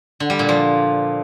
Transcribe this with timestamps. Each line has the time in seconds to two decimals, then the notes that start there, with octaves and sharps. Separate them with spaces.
0.20 D3
0.30 G3
0.39 A#2
0.49 F3